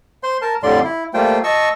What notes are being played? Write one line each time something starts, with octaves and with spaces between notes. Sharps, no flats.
C5 C6
A#4 A5
F2 A2 D3 G3 D5 C6
E4
G3 A3 A#3 F4 C5 G5
D#5 A5 C#6 E6